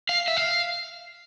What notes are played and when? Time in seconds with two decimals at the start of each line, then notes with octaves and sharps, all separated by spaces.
0.09 F5
0.28 E5
0.37 F5